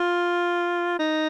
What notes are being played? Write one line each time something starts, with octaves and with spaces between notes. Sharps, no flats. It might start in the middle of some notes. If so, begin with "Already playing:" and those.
Already playing: F4
D#4